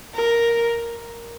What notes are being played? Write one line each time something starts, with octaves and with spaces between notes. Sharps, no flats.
A#4